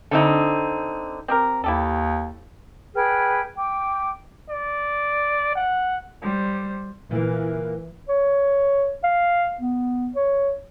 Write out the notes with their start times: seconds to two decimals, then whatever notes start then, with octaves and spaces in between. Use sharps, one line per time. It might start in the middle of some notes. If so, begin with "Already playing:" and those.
0.11 D3 C4 D#4
1.28 C4 G4 A#4
1.64 D#2 E4 G4 A4
2.95 G#4 B4 G5 F6
3.56 G5 D6
4.50 D5
5.56 F#5
6.22 G3 C5
7.11 A#2 E3 A#3
8.09 C#5
9.04 F5
9.61 B3
10.15 C#5